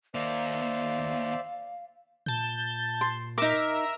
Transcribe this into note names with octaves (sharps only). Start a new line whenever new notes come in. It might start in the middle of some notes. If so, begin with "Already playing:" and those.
D#2 A#3 C5 D5 E5 F5
A#2 A5 G6
C6
D#4 A#4 E5 D6